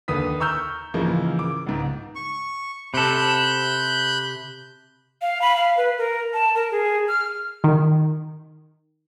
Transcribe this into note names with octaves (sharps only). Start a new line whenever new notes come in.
D#2 D3 B4 D#6 B6
A#5 C#6 E6 F6 G6
G#2 C#3 E3 F3 G#3 A#3
D6
C#2 G#2
C#6
C3 A4 B5 F#6 G6
F5
B5
F5
B4
A#4
A5
A#4
G#4
F6
D#3